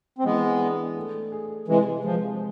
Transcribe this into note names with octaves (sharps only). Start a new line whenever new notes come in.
C4
E3 G#3 B3
D4
A3
G#4
C3 E3 G#3
F3 G#3